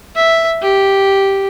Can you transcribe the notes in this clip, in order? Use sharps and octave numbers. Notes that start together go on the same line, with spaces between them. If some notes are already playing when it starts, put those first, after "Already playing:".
E5
G4